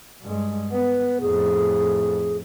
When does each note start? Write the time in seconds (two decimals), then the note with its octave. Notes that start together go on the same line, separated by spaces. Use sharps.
0.22 G2 G#3
0.71 B3 B4
1.20 F2 A2 G#4